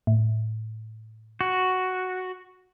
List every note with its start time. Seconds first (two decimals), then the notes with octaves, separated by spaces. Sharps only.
0.07 A2
1.41 F#4